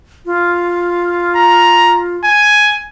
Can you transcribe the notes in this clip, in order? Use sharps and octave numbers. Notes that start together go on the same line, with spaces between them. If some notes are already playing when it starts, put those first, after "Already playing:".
F4
A#5
G#5